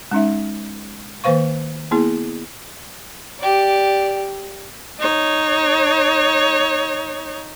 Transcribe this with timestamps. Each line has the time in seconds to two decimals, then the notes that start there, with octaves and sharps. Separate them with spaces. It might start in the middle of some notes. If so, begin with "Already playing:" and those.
0.11 G#3 C#4 D#4 E5
1.24 D#3 A#3 B4 C5 F5 C#6
1.91 A#3 B3 E4 G#4
3.40 G4 D5
5.00 D#4 C#5